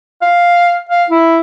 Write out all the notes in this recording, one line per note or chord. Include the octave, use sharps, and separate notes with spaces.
F5
F5
E4